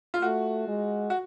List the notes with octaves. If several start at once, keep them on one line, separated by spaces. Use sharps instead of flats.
F4
A3 F#4
G#3
F#4